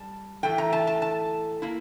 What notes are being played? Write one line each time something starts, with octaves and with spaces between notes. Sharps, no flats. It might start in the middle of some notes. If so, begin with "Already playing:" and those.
Already playing: G3 A5
A2 E3 A3 G5
A#5
A5
A5
A5
A#3 E4